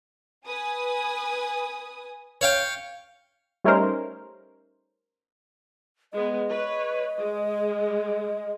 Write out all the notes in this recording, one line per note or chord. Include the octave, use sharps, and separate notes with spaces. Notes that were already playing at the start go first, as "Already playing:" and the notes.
B4 G#5 D#6
C#5 F5 G5
G3 A3 C#4 D#4 A#4 C5
G#3 B3 D#5
B4 C#5
G#3